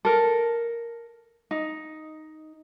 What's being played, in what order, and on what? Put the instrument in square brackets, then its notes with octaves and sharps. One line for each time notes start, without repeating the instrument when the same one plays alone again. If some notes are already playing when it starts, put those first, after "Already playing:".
[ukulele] A4 A#4
D#4